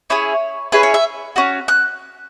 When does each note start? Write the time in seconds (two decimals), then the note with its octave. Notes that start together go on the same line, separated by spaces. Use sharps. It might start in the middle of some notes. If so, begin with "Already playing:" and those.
0.10 C#4 E4 G#4 C#5
0.72 C#4 E4 G#4 B4
0.83 C#5
0.94 E5
1.36 C#4 F#4
1.68 F#6